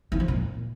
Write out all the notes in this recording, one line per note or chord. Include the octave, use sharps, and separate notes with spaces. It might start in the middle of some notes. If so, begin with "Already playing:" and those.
E3
F3
A#2